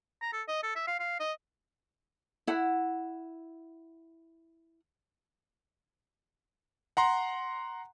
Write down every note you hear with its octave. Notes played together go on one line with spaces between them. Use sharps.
A#5
A4
D#5
A4
E5
F5
F5
D#5
E4 F#5
F#5 A#5 C6